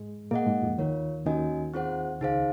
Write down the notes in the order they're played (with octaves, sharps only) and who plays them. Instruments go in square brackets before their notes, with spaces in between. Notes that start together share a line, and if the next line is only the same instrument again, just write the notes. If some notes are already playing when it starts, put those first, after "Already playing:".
Already playing: [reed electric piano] G#2 G#3
[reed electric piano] A#2 A#3 [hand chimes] G#4 D#5 F#5
[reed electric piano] G#2 G#3
F2 F3
[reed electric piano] D#2 D#3 [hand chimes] F4 A#4 C#5
[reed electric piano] D#2 D#3 [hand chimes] C#4 F#4 A#4 D#5 G#5
[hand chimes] C4 F4 G#4 C5 F#5
[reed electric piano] C#2 C#3 [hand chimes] D#4 G#4 C5 F5